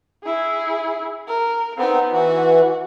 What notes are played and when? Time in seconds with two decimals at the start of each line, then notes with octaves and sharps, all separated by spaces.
0.24 E4 G#4
1.28 A#4
1.78 B3 C4 D#4
2.12 E3 F#4